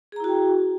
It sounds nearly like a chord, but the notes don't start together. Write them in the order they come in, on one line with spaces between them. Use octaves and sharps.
G#4 A#5 E4 F#4 G5